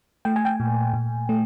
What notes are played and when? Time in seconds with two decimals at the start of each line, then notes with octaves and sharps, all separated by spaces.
0.25 A3 G5
0.36 G#5
0.45 G5
0.60 A#2
0.94 A#2
1.29 A3